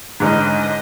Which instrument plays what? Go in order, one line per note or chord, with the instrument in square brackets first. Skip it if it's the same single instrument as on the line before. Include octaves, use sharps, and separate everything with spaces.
[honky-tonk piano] G#2 D3 E3 [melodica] C#4 D#4 B4 [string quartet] D#5